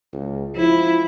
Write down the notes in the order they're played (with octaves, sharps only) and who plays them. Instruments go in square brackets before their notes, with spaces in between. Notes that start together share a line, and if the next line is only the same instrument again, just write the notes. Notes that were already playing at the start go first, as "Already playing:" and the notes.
[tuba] C#2
[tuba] F3 [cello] E4